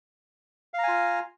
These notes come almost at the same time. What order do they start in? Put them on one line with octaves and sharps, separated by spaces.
F5 A#5 G#5 F4